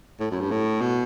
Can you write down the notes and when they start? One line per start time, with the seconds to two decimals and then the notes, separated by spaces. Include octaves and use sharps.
0.20 A2
0.31 F#2
0.41 G2
0.51 A2
0.81 B2